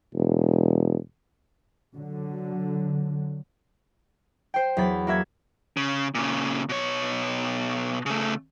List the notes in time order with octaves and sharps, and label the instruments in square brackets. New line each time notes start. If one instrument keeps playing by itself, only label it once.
[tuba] E1
[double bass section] D3 F#3
[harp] C5 G5
E2 F#3 B3 B5 A6
A#3 F#4 E5 G#6
[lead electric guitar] C#3
A#2 C#3
B2 C#5
C#3 A3